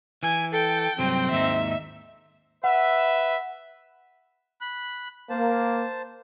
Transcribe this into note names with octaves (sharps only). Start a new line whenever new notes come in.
E3 G#5
A4 G5
G2 C3 F#3 C4
D#2 G#2 D#4 E5
B4 E5 F#5
B5 F#6
A#3 C5 A5